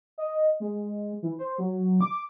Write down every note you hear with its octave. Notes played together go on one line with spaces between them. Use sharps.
D#5
G#3
E3
C5
F#3
D6